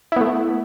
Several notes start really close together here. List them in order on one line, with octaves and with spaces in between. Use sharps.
E4 B3 A3